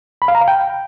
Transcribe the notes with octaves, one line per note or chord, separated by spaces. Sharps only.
B5
F5
A#5
F5
G5